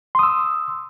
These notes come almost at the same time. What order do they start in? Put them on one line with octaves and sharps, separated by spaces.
C6 D#6 E6